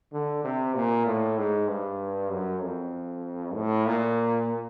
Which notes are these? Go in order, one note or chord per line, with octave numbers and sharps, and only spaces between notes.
D3
C3
A#2
A2
G#2
G2
F#2
F2
A2
A#2